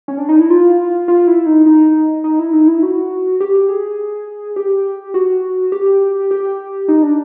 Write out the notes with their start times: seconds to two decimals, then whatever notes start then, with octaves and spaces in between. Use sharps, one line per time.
0.08 C#4
0.18 D4
0.29 D#4
0.40 E4
0.50 F4
1.08 F4
1.28 E4
1.46 D#4
1.66 D#4
2.24 D#4
2.39 E4
2.53 D#4
2.68 E4
2.83 F#4
3.41 G4
3.69 G#4
4.56 G4
5.14 F#4
5.72 G4
6.31 G4
6.88 D#4
7.03 D4